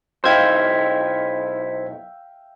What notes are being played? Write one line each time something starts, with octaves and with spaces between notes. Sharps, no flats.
B1 D#4 E4 C5 E5 F5 G5 G#6